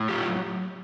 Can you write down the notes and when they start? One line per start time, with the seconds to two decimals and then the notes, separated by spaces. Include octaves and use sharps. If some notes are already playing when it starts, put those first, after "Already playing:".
Already playing: A2
0.09 F#3 F4 G4